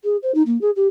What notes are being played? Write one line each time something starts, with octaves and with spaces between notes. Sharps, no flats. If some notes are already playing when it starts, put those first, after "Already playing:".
G#4
C5
D#4
A#3
G#4
G4